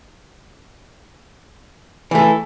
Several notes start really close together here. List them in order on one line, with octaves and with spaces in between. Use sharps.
E3 A3 A4